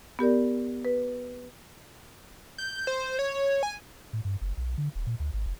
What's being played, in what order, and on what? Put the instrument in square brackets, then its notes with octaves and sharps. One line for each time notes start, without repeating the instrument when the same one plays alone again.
[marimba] B3 G4 A#4 D5
B4
[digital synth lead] G6
C5
C#5
G#5
[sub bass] A2
G2
F#1
B1
D3
D#1
A#2
D2
G#1
F1